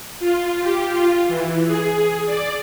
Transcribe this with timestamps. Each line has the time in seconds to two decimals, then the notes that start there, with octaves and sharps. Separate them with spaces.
0.20 F4
0.61 G4
0.90 F4
1.28 E3
1.65 G#4
2.26 D5